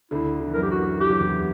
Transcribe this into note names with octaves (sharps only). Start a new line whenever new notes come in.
D2 D3 E4
D3
E3
F#2 F#3 A#4
G4
F#4
E3 G4
F#3
E2 E3